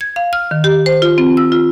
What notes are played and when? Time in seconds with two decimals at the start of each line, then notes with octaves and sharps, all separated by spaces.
0.01 G#6
0.16 F5
0.33 F6
0.51 D#3
0.64 G4
0.86 C5
1.02 F4
1.18 C4
1.37 E6
1.52 F4